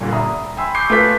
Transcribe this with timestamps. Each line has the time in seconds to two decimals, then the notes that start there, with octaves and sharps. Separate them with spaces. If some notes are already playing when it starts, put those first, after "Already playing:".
0.01 G2 A#2 D3
0.12 E5 A#5 D#6
0.57 G5 G#5 B5 C6 E6
0.75 C#6 D6 G6 C7
0.90 A3 F4 B4 D6 B6